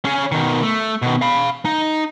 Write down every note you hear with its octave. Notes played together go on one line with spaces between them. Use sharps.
C#4 G#4
B2 D#3
A3
B2 D#3
F5 B5
D#4